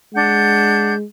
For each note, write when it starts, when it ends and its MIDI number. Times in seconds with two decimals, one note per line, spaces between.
0.15 1.04 56
0.15 0.93 62
0.15 0.93 78
0.15 0.93 91